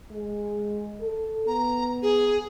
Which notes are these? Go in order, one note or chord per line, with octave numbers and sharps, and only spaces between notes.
G#3
A4
B3 A#5
G#4